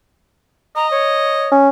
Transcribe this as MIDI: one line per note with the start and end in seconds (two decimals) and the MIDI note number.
0.76 1.55 75
0.76 0.89 82
0.91 1.49 73
1.52 1.70 61